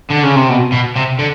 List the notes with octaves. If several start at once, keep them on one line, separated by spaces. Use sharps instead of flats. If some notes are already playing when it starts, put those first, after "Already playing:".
D3
C#3
C3
B2
B2
C3
D3